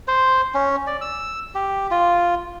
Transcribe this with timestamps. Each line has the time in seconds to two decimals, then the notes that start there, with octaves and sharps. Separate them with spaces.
0.08 C5
0.54 C#4
0.87 D5
1.01 E6
1.55 G4
1.91 F4